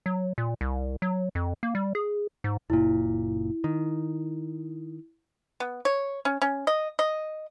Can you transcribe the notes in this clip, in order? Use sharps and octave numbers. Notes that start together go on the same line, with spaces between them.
F#3
A#2
C2
F#3
F2
A#3
G3
G#4
G#2
F#1 A#2 E4
D#3
B3
C#5
C#4
C#4
D#5
D#5